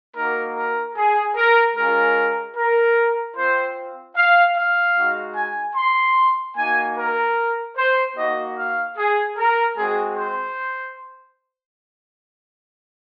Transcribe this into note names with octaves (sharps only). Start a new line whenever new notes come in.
A#3 D#4 F#4 A#4
A#4
G#4
A#4
G#3 C#4 F4 A#4
A#4
C4 F4 C5
F5
F5
G#3 D#4 F#4
G#5
C6
A#3 D#4 F#4 G#5
A#4
C5
A#3 D#4 F#4 D#5
F5
G#4
A#4
G#3 C4 F#4 G#4
C5